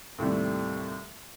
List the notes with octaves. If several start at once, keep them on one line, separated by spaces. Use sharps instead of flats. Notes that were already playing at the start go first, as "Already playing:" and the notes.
D#2 A2 C3 G3